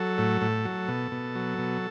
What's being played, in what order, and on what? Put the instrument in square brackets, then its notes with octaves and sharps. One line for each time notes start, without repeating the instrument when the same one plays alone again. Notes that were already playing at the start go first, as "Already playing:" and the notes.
Already playing: [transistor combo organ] F#3 A4
A2
A2
F#3
B2
B2
F#3
B2